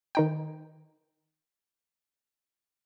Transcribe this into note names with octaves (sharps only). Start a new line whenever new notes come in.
D#3 D#4 G5